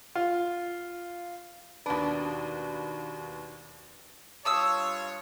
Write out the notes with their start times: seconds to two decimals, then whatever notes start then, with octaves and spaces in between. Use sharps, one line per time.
0.15 F4
1.86 D#2 B2 D4 B4
4.45 G2 F4 C#5 A5 D#6 E6